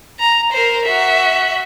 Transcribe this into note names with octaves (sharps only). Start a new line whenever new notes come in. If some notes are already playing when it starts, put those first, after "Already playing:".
A#5
A#4 C5
F#4 E5